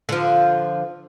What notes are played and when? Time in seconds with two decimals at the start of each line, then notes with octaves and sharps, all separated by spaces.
0.09 D3 F3